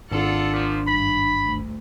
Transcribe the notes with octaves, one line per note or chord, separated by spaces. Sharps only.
G#1 D4 F4 A4 D5 F#5
A#2 F3
G2 B5
D2